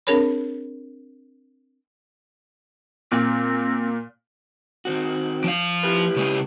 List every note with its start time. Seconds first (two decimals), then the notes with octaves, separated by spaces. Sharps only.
0.07 C4 D4 G#4 A#4 C#5 B5
3.12 A#2 C4
4.85 D#3 C4 F#4
5.44 F3 F5
5.83 E4 G4 B4
6.16 C#3 G#3